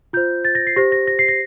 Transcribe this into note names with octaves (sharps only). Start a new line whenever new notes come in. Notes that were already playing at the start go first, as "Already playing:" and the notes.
F4 C5 G6
A6
A#6
C7
G4 C5 A#6
A#6
A#6
C7
A#6